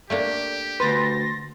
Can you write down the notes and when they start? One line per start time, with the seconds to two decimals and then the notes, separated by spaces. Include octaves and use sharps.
0.10 A3 A#3 D4 G4
0.80 D2 B4 C6 A6 A#6